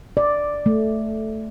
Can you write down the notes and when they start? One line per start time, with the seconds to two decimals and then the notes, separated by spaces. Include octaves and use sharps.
0.17 D5
0.66 A3